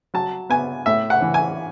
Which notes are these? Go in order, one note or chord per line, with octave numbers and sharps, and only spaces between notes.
F#3 A5
B3 G#5
A2 E5
F#5
E3
G#5